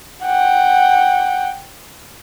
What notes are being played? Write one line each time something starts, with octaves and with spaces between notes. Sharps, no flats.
F#5 G5